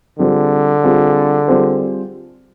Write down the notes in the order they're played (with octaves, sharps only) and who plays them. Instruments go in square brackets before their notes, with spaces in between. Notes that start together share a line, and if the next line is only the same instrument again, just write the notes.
[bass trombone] D3 [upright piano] G3 C4 F4 G#4 C5
[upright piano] G3 C4 F4 G#4 C5
G3 C4 F4 G#4 C5